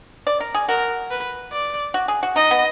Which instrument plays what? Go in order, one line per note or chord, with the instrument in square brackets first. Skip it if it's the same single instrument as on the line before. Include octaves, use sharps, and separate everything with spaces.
[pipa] D5
A#4
G#4
[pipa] F#4 [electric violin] A#4
[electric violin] B4
D5
[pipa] F#4
G#4
F#4
[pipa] D#4 [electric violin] D#5
[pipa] B3